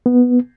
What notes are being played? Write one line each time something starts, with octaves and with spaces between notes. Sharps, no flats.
B3